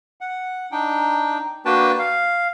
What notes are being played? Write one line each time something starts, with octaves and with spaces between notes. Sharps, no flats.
F#5
D4 D#4 G5
A#3 D4 F#4 B4 G5 A5
F5